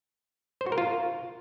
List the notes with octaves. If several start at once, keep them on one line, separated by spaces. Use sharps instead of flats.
C5
F#4
A#4
F4